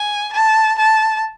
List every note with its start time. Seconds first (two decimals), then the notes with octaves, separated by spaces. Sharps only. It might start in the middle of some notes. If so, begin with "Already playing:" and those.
Already playing: G#5
0.33 A5
0.78 A5